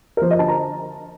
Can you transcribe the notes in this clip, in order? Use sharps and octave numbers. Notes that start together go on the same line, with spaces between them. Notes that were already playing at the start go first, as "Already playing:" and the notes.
A#4
F3 C5
D#5
D3 A5
A#5